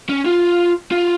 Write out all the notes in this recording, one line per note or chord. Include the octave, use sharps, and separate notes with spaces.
C#4
F4
F4